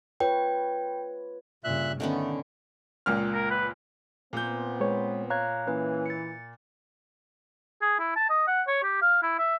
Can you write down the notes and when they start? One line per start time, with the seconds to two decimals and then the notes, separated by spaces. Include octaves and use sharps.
0.20 F4 B4 C#5 G5
1.64 G2 A#2 C#3 E5 F#6
2.00 D3 D#3 A3 B3 C#4
3.06 C#2 A#2 F6
3.34 A#4
3.51 B4
4.33 A#2 B3 C4 G6
4.80 G#3 B4 C#5
5.30 C#5 F5 A#5 F#6 G#6
5.67 E3 A#3 C#4 B4
6.06 A6 C#7
7.82 G#4
7.99 E4
8.16 A5
8.29 D#5
8.47 F#5
8.67 C#5
8.83 G4
9.02 F5
9.23 E4
9.39 E5